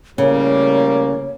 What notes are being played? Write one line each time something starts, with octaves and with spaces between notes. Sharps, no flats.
A2 C#3 G3 A#3 C#5